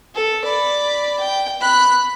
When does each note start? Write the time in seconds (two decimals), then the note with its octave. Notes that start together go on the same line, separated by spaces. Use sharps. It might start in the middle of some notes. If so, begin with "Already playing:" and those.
0.15 A4
0.45 D5 B5
1.20 G5
1.60 B5 F#6